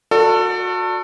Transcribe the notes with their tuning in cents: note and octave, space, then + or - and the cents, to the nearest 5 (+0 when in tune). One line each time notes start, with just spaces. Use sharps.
F#4 -25 A4 +25 D5 +0